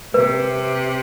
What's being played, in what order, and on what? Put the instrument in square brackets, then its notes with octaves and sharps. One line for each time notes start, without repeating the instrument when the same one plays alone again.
[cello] C3 [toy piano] B4